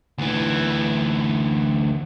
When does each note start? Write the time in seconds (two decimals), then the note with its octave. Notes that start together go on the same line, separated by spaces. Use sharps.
0.18 D2 E3